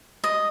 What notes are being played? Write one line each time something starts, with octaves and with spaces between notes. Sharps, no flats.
D#5